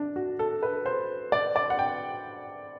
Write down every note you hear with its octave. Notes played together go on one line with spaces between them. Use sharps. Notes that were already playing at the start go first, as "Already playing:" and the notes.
Already playing: D4
F#4
A4
B4
C5
D5
D5
F#5
G5